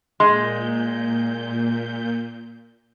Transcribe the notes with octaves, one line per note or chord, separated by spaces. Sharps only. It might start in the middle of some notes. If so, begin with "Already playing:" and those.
A#2 G#3 C6 G6